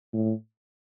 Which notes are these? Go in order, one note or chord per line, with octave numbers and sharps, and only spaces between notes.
A2